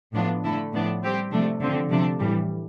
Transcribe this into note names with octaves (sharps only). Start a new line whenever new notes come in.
A2 F3 B3 D4 F4
D3 A3 E4 A4
A2 F3 B3 D4
G3 C4 G4
C3 F3 A3 D4
D3 F3 C4
C3 F3 A3 D4
A2 E3 G3